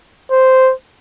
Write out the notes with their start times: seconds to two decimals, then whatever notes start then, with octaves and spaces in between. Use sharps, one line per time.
0.31 C5